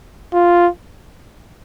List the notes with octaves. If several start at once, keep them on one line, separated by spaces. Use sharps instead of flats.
F4